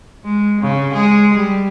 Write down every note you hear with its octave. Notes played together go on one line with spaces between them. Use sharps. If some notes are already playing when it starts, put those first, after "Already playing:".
G#3
C#3
G#3 G#4
G3